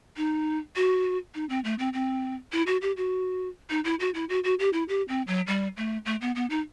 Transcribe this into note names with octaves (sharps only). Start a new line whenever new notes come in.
D#4
F#4
D#4
C4
A3
C4
C4
E4
F#4
G4
F#4
D#4
E4
F#4
E4
F#4
F#4
G4
E4
G4
C4
F#3
G3
A3
A3
B3
B3
D#4